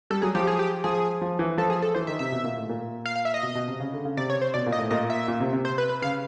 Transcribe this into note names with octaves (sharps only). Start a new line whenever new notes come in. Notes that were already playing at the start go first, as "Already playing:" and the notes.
G3 A4
F#3 G#4
F3 G4
G#4
G4
F3 G#4
F3
E3
F3 A4
G#4
A4
E3 C5
D#3 E5
C3 E5
B2
A#2
A2
A#2
F5
F5
E5
D#5
B2
B2
C3
C#3
D3
C#3
C3 D5
C#5
C5
B2 D5
A#2
D#5
A2
A#2 D#5
E5
A#2
C3
C3
C5
B4
B4
C#3 F5